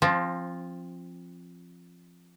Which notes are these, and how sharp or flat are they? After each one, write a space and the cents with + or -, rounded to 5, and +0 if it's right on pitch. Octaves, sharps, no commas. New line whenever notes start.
F3 +0 C4 +25